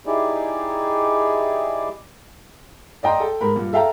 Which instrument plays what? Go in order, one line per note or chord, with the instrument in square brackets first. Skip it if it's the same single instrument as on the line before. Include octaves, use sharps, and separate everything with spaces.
[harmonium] D#4 E4 G4 G#4 D5
[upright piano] D5 D#5 G5 A#5 C6
A4 G5
G#2 A#4 B5
G2 A#2
A4 E5 F5 G5 A5 A#5